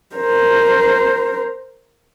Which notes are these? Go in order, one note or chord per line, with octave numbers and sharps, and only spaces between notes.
A#4 C5